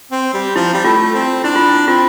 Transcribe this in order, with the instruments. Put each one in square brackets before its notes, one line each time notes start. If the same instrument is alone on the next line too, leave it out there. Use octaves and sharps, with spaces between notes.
[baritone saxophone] C4
G3
[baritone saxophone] F3 [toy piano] E4
[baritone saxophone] G3
[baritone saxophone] A3 [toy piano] F4
[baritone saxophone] C4
[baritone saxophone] D4 [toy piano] E4
[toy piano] F4
E4
[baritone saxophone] C4 [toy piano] F4